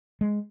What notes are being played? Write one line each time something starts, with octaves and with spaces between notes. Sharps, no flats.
G#3